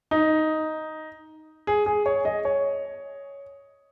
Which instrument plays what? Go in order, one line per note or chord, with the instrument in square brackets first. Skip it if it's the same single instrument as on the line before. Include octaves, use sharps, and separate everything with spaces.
[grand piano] D#4
G#4
G#4
C#5
D#5
C#5